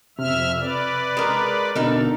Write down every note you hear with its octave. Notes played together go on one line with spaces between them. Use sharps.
F2 C3 E5 F6
B4 D5
G#3 A#4
B2 D3 D#4 A4 A#4